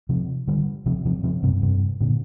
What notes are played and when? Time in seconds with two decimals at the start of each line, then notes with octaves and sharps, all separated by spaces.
0.09 C3 F3
0.48 D3 G3
0.86 C3 F3
1.05 C3 F3
1.23 C3 F3
1.43 G2 C3
1.62 G2 C3
2.01 A#2 D3